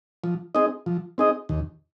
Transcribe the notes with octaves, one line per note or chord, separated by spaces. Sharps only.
F3
C4 D#4 G#4 D#5
F3
C4 D#4 G#4 D#5
D#2